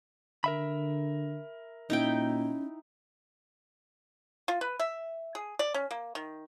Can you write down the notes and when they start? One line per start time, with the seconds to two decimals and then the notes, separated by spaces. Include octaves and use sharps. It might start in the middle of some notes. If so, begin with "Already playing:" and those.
0.44 D3 A#4 E5 B5
1.90 A#2 C#4 D#4 E4 G5
4.48 F4
4.61 B4
4.79 E5
5.35 G#4
5.59 D5
5.74 C#4
5.91 A#3
6.15 D#3